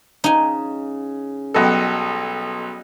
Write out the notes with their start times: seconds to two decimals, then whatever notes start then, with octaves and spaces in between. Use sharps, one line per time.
0.24 C#3 D#4 G#5
1.54 B1 G3 A4 D#5 F#5